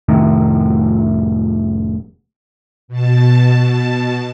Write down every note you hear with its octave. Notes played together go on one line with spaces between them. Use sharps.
F1 A2 D#3
B2 A5